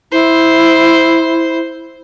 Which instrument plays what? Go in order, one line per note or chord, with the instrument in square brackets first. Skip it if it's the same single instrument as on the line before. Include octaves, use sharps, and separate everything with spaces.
[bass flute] E4 [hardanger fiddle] C5